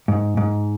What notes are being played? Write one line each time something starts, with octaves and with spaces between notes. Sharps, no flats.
G#2
G#2